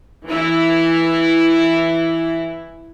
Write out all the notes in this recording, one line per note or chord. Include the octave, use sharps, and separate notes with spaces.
E3 E4